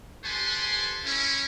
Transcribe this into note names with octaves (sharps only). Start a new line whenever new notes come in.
G4 A4 B4 C5 G#5 C6
C#4 E4